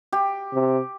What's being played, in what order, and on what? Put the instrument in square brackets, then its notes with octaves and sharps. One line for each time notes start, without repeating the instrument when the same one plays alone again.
[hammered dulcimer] G4
[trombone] C3